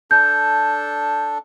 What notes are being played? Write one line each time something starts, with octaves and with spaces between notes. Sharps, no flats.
D4 A4 G6